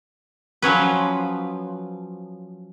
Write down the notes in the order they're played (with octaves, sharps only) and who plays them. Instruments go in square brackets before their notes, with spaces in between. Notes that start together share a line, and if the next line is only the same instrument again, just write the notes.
[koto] F3 F#3 C#4 B4